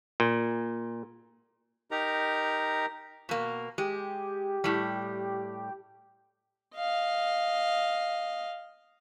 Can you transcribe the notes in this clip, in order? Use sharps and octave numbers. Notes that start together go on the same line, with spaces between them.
A#2
D#4 G4 A#4 A#5
B2 A#3
G#3 G4
A2 G3
D#5 F5